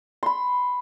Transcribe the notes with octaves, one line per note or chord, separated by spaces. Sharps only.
B5 C6